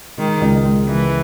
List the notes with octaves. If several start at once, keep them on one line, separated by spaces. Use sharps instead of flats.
D#3 G#3
C#2
G#3
C#2 E3